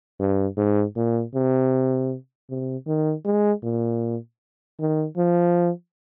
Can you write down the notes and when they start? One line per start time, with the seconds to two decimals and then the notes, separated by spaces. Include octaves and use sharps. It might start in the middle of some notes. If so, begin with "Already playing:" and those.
0.20 G2
0.57 G#2
0.97 A#2
1.35 C3
2.50 C3
2.87 D#3
3.25 G#3
3.63 A#2
4.79 D#3
5.17 F3